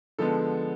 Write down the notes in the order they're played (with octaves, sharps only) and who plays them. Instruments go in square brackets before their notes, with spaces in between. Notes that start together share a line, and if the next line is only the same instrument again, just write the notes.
[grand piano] D3 F3 G#3 B3 A4